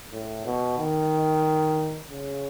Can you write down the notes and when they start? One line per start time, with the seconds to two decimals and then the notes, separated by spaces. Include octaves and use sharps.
0.12 A2
0.45 B2
0.78 D#3
2.10 C#3